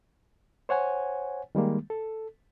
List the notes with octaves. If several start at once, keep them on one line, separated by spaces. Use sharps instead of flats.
C5 C#5 F#5 G#5
D#3 G3 G#3 A#3
A4